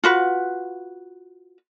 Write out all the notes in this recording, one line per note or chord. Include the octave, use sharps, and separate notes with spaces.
F4 F#4 B4